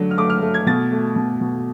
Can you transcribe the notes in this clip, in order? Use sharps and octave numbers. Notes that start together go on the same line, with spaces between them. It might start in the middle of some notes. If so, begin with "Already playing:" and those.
Already playing: D3 F#3 A3
F6
A3 D6
F6
A3
G#6
B2 A6
A3
B2
B2